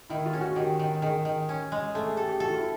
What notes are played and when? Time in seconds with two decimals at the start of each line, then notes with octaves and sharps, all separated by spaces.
0.10 D#3 E4
0.26 F4
0.33 C#4
0.41 F#4
0.56 D#3 G4
0.79 D#3
1.02 D#3 G#4
1.25 D#3
1.49 C#4
1.72 G#3
1.95 A3 A4
2.07 G#4
2.17 G4 A4
2.29 G4
2.40 F#4 A4
2.49 F4
2.58 E4